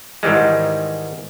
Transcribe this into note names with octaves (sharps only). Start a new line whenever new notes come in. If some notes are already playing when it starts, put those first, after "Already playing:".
G#2 D#3 E3 G3 G#3